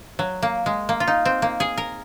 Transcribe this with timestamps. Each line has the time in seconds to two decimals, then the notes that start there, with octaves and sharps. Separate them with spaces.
0.19 F#3
0.43 A#3
0.66 G#3
0.89 A#3
1.00 F4
1.08 D#4
1.25 C4
1.42 A#3
1.60 G#4
1.78 A#4